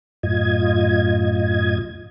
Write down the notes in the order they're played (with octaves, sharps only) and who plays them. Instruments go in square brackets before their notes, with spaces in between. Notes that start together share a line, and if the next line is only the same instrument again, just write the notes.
[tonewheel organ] F#2 A2 F4 D#5 G#6